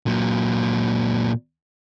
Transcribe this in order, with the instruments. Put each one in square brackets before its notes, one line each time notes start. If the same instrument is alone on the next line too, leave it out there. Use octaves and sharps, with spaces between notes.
[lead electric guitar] A#2 F#3